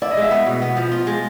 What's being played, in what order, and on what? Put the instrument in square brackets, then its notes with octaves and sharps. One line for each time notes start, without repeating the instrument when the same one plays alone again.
[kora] E4 [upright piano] D5
[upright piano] D#5
[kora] G#3 [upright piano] E5
[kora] B3
B2
B3
F3
F4
G#3